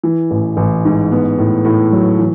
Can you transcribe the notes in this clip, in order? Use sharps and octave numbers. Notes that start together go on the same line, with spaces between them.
E3
A1
A1
G#2
B3
A2
A2
F#3
E3